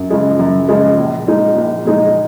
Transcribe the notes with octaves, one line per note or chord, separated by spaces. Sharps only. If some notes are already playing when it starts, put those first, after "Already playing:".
Already playing: F#2
C#3 F3 G#3
F#2
C#3 F3 G#3
A#1
A#2 F3 G#3 D#4
A#1
A#2 F3 G#3 D#4